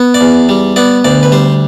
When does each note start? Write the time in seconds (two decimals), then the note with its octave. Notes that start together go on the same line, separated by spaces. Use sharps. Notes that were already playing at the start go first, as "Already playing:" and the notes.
Already playing: B3
0.14 D5
0.21 E2
0.49 G3
0.76 B3 D5
1.04 D2 D5
1.23 B4
1.32 G3 C5